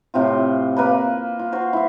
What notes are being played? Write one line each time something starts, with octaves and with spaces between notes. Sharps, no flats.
A2 C3 C4 F4
A#3 B4 B5
F4
F#4 C5 C6
E4 E5